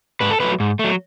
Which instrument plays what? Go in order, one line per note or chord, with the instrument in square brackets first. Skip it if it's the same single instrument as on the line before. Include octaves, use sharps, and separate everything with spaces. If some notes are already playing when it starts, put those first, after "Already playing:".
[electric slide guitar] G#2 B4
A4
F#3 A3 B4
G#2
A3
F#3